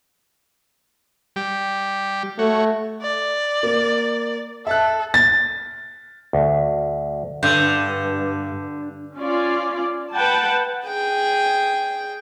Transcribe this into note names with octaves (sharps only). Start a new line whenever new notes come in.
G3 G4
A3 F#4 C#5
D5
A#3
A4 E5 A5 F#6
A6
D2
G2 D3 G6
C#4 F4 D5
B4 F#5 G5 A5
G#4 G5